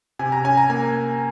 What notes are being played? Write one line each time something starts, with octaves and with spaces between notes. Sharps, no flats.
C3 G#5
A#5
C#4 G#5
A#5
A#3 G#5